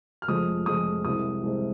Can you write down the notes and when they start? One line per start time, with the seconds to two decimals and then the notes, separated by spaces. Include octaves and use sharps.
0.22 F6
0.28 F1 F2 F3 G#3 D#6
0.66 F1 F2 F3 G#3 D#6
1.04 C2 C3 G#3 C4 D#6
1.43 C2 C3 G#3 C4